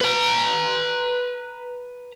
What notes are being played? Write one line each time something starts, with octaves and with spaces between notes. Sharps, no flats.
B4 A#5